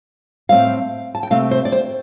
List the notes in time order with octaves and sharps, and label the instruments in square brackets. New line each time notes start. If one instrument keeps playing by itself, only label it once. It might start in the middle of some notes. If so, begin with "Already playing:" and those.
[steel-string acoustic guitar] A2 A3 C4 F5
A5
G5
C3 A3 C4 F5
C5
D5
C5